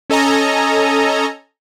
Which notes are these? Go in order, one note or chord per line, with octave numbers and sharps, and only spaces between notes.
C#4 A4 D#5 G#5 A#5